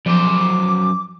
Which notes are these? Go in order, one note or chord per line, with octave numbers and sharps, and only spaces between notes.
F#2 F3 C5 D6